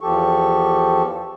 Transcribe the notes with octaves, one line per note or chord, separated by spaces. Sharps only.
E2 F3 G4 A4 C#6